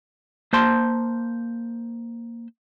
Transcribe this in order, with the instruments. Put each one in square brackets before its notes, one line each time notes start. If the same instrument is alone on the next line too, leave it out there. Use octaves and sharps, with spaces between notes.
[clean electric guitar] A#3 C5 A5 C6